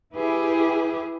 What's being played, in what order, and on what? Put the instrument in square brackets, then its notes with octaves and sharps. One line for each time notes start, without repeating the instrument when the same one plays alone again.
[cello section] E4 G4 G#4 B4